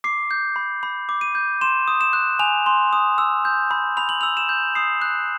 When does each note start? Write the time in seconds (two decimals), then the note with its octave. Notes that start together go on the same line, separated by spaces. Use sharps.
0.04 D6 C7
0.31 G6
0.56 B5
0.83 B5
1.09 D6
1.21 D#7
1.35 G6
1.61 C6 E7
1.88 D#6
2.01 E7
2.13 F#6
2.39 G#5 F7
2.66 C6
2.93 D#6
3.18 E6
3.45 G6
3.71 B5
3.97 B5 F7
4.09 F#7
4.21 E6 F7
4.37 E7
4.49 G6
4.75 D#6 C7
5.02 F#6